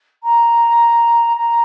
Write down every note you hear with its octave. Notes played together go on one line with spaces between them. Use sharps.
A#5
A#5